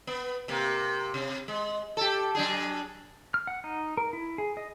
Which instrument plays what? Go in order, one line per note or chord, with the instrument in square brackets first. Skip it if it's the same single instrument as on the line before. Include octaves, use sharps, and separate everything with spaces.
[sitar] B3
C3 A#3
C3
G#3
G4 A4
F#3 D4 G#4
[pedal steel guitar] F6
F#5
D#4
A#4
E4
G#4
D#5